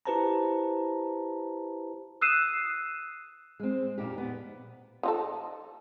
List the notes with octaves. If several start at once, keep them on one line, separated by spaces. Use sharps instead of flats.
E4 G4 B4 C5 A5 A#5
D#6 E6 F#6 C7 D#7 E7
G#3 C4
F2 A#2 D#4 G4
B3
F3 D#4 A4